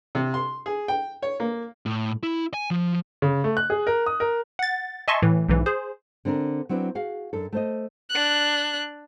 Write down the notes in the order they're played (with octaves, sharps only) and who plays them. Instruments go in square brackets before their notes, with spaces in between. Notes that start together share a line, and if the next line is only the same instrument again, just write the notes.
[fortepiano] C3
C6
G#4
G5
C#5
A#3
[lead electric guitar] A2
E4
G#5
F3
[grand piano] C#3
A3
F#6
G#4
A#4
D#6
A#4
[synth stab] F#5 A6
D#5 E5 G#5 A5 C6 C#6
A2 E3
B1 G#2 E3
G#4 C5
[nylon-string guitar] D3 C4 D4 A#4
F#3 C4 D4 E4 B4
F#4 G#4 F5
F#2 D4 A4
A3 C5 D#5
[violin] D4 F#6